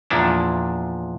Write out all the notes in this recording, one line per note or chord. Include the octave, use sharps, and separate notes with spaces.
E2 A#2 F3 D4 E4